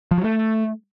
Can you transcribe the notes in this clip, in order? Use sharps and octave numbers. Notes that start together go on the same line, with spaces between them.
F3
F#3
A3